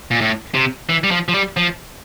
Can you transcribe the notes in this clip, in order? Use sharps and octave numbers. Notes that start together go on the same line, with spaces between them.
A#2
A2
C3
E3
G3
F3
F3
G3
F3